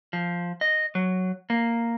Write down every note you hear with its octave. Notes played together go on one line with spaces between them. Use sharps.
F3
D#5
F#3
A#3